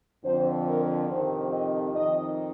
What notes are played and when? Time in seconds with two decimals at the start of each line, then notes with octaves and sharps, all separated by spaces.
0.23 F2 D3 F3 C5
0.66 A#4
1.08 F2 C3 D#3 C5
1.50 D#5
1.93 F2 D#3 D#5